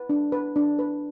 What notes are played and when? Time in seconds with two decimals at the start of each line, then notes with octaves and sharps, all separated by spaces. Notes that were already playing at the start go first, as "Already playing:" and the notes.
Already playing: B4
0.09 D4
0.32 B4
0.56 D4
0.79 B4